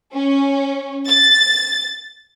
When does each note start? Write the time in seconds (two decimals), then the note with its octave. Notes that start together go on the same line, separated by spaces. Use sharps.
0.13 C#4
1.09 A6